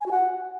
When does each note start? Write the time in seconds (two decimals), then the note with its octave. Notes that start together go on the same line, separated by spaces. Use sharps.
0.01 G#5
0.06 F#4
0.11 F#5